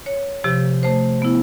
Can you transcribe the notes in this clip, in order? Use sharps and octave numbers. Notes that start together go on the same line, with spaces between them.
C#5
C3 F3 G4
A3 C5
B3 E4